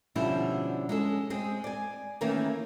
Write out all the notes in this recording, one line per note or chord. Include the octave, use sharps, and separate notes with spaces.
B2 D3 F3 G3 C#4 E4
G#3 C#4 A4
G#3 C4 G#4
D5 G#5
D#3 E3 A3 A#3 C#4